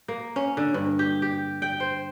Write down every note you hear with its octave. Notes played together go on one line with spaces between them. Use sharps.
A#3
C#4
D3
G2
G4
G4
G5
C5